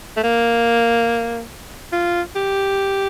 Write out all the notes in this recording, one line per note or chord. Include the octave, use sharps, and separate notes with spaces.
A3
A#3
F4
G4